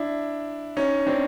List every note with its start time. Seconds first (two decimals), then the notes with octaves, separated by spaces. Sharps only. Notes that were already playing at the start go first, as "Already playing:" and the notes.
Already playing: D4 E4
0.77 C#4 D#4
1.07 C4 D4